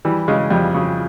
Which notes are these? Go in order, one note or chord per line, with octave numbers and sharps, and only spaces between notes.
E3 G3
C#3 G#3
F2 G3
C#3